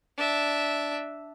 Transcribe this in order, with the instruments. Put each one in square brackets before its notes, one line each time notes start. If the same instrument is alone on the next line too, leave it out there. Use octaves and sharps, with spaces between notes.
[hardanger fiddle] D4 E5